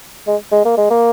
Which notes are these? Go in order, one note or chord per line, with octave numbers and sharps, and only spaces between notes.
G#3
G#3
A#3
G#3
A#3